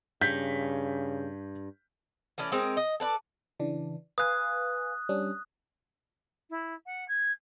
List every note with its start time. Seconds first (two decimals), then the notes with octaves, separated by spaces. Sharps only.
0.21 G2 C#3 G6 B6
2.38 E3 A3 C#4 D5
2.52 G#3 C4 D#4 A#4
2.77 D#5
3.00 A4 B4 D5
3.60 C#3 E3 D4
4.18 B4 F5 G#5 D#6 F#6
5.09 G3 C#4 D4
6.49 E4
6.86 F#5
7.08 G#6